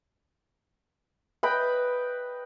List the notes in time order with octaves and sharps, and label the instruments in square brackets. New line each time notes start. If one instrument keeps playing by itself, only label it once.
[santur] B4 D#5 G5 B5